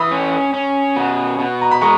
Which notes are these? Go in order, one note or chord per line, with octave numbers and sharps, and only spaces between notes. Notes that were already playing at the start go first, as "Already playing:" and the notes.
Already playing: E3 B5 D#6
C#4
C#4
B2
B2
A#5
B5
G#3 A#5 C#6